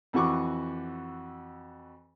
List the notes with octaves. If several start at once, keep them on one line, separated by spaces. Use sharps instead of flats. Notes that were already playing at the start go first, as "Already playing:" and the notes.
F2 E3 F#4 C#6 D6